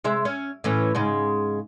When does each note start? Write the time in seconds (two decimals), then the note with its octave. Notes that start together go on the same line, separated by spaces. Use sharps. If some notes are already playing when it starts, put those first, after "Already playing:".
0.04 C3 G#3 E5
0.25 C#4
0.64 A2 E3 C#4
0.95 G#2 C#3 G#3